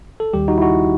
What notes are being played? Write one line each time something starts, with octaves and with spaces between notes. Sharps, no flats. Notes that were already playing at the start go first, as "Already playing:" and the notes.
A4
D#2 D#3 G3 G4
D#4 F#4
E4
D#4 F#4